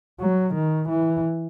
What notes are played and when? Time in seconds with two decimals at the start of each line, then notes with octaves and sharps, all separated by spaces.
0.20 F#3
0.54 D#3
0.89 E3